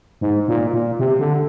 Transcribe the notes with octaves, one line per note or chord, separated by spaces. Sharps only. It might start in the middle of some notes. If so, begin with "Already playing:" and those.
G#2
A#2
A#2
C3
D3